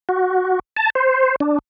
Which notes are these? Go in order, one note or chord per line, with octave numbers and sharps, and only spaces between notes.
F#4
A5
C5
D4